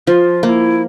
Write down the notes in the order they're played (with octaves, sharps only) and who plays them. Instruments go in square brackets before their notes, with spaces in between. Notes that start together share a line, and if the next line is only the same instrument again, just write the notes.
[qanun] F3 [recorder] F4
[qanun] A#3 [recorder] F4
[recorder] E4